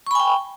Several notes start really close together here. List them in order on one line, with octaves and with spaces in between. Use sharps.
C#6 B5 G#5 G5